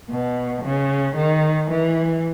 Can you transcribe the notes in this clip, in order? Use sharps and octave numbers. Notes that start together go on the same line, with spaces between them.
B2
C#3
D#3
E3